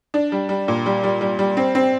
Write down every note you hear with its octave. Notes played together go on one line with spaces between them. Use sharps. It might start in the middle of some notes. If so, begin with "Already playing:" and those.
D4
G3
G3
A#2
G3
G3
G3
G3
C4
C4